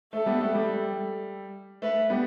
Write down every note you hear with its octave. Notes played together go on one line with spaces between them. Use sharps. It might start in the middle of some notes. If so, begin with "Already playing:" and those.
A3 A4
G3 B3
A3
G3
A3 B4
G3 B3